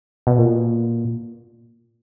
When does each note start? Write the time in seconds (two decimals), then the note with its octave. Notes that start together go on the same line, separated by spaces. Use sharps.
0.27 B2
0.38 A#2